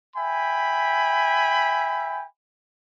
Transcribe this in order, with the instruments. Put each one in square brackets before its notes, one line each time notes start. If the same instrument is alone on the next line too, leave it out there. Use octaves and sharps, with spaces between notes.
[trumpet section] E5 G5 G#5 B5